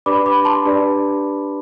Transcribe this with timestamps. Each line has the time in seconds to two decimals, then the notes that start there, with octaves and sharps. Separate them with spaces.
0.06 D4 G4 B4 D5 B5 D6
0.26 B5 D6
0.45 A5 C6
0.65 D4 G4 B4 D5